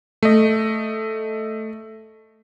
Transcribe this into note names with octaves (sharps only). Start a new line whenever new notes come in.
A3 D#5